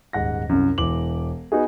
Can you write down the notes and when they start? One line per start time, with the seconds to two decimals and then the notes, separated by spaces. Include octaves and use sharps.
0.13 D#1 G#2 F#5 A#6
0.49 C2 F#2
0.78 E1 E3 D6 F#7
1.52 B3 D#4 F#4 G#4